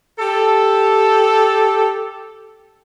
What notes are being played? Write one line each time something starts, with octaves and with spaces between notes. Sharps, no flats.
G4 A4